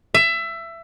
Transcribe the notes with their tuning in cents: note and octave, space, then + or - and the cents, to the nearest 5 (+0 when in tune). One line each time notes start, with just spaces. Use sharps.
E5 +20